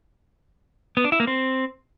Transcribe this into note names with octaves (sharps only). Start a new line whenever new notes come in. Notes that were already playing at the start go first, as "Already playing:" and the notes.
B3
D4
E4
A#3
C4